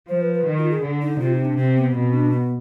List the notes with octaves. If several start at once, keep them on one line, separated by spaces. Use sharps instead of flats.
F3 C5
B4
B4
D#3
F4
G#4
D3
D#4
C3 F4
D#4
D4
C3 C4
B3
B2 C4
D4
B3